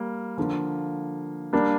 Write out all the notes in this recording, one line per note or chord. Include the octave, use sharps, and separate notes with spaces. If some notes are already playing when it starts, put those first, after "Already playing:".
Already playing: G3 A#3
D3 F3 A#3
G3 A#3 D4